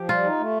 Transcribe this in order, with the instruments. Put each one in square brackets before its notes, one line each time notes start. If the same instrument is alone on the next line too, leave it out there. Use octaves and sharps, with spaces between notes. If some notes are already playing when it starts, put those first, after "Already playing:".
Already playing: [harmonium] F3 [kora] G4
[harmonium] G3 [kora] F4
[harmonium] D#4
A3